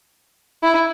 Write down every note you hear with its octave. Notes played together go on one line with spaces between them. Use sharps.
E4